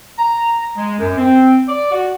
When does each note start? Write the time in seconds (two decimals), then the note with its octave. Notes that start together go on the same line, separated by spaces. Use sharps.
0.18 A#5
0.77 G#3
0.98 F#2
1.17 C4
1.68 D5
1.91 F#4